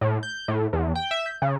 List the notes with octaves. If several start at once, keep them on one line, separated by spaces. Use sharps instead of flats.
A2
G6
A2
E2
G5
E5
G6
C#3